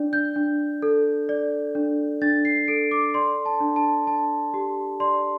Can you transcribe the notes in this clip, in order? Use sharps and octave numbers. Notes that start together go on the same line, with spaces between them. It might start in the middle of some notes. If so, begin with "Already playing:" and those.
Already playing: D4 D5
G6
D4
A4
D5
D4
D4 A6
C7
A4 D7
D6
D5 C6
A5
D4
A5
D4 A5
G4
D5 C6